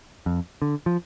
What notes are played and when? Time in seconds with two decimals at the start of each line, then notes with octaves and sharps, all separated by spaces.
0.26 F2
0.62 D3
0.86 F3